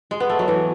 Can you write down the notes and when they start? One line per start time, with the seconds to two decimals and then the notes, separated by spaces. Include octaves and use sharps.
0.11 G#3
0.20 B3
0.29 A3
0.39 F#3
0.48 E3